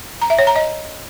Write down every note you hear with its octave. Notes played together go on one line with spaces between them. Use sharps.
A#5
E5
C#5
A#5
D#5